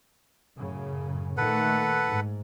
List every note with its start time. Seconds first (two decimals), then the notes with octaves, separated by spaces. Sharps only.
0.56 F#2 A2 C#3
1.38 A#2 D#3 A3 A4 B4 F#5
2.07 G#2